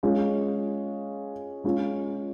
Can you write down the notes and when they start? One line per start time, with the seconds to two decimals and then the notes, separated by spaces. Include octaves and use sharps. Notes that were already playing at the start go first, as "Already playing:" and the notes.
0.03 G#3 C#4 F4
1.64 G#3 C#4 F4